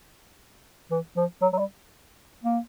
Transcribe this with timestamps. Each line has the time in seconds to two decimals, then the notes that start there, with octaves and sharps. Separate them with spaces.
0.91 E3
1.17 F3
1.42 F#3
1.53 F#3
1.59 G3
2.43 A#3